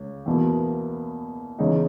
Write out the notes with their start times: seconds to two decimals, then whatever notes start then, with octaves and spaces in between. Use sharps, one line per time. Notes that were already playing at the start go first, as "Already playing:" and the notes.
Already playing: C#2
0.26 E2 B2 A#3
1.59 E2 C#3 G#3 D#4